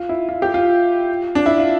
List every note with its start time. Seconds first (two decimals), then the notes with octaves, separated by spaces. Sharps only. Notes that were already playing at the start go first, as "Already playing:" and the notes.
Already playing: F4
0.09 E4
0.29 F4
0.42 G4
0.54 F4
1.35 D4
1.46 E4
1.58 F4